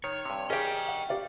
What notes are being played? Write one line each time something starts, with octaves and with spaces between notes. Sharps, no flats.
D#3 C#5 C#7
G2 C3
C#4 G4 G#4 D5 D#5 G5
F#5
G4 D5 F5